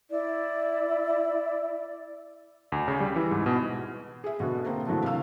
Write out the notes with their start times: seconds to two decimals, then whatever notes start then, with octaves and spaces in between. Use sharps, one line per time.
0.10 E4 D5
2.72 D2
2.88 C#3
3.00 G3
3.16 E3
3.31 G#2
3.46 B2
4.24 G#4 E5
4.40 B2 D3 B3
4.66 A#3 C4
4.86 D3 E3 F#3 A3 D4
5.03 C3 A3 F5 E6